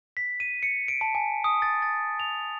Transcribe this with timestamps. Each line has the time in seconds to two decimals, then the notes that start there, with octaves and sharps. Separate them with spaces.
0.17 B6
0.40 D#7
0.63 C#7
0.88 D7
1.01 A5
1.15 G#5
1.44 D#6
1.62 A6
1.82 A6
2.20 F7